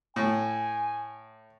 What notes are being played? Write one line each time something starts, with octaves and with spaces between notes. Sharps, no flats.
A2 G#5